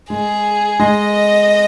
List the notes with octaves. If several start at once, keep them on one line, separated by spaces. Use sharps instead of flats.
G#3 G#4
G#3 D#5